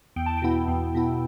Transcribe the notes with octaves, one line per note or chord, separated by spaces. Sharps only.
E2 G5
A5
G5
B2 B3 E4
E2
B2 B3 E4